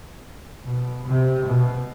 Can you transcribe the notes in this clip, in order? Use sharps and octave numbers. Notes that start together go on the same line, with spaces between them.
B2
C3
B2